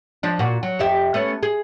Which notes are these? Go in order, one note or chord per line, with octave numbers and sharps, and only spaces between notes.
F3 D4
A#2 F#4
F#3
F2 G4 E5
A3 B3 C#4
G#4